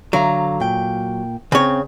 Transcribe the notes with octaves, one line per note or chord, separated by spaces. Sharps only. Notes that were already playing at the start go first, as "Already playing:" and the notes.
D3 F#3 F5 A#5
A#2 G5
C#3 C4 C#5